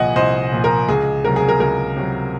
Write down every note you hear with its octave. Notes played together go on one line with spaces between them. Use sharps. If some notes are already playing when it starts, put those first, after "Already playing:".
Already playing: C2 A#2 F3 D#5 F#5 G#5
C2 C5 D#5
A#2 F3
A#4
C#2 G#4
C3 F#3 A#4
G#4
A#4
C#2 A#4
C3 F#3